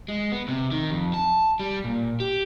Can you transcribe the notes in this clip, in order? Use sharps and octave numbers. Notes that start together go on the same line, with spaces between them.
G#3
B3
C3
D#3
F2
A5
G3
A#2
G4